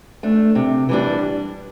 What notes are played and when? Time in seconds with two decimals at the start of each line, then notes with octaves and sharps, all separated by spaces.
0.23 A3 D4
0.55 C3
0.89 E3 G3 D4